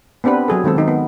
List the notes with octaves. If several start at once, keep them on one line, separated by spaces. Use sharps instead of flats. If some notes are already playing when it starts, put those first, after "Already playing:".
B3 C4 D4 G4 B4
F#3 G#4 A4
D#3 G#3 C4 A4
D#3 D#4
B3